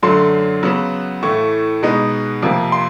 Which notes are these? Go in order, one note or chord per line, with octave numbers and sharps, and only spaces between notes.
F#2 D3 F#3 A3 C6
C#3 F#3 B3
A2 E3 A3 C#6
B2 G#3 B3 D#4
F2 C3 F3 A#3
C6